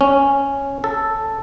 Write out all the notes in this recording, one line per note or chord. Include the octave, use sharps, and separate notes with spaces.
C#4
A4